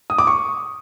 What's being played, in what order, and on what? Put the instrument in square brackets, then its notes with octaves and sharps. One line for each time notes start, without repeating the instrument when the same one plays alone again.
[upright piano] D#6
D6
C#6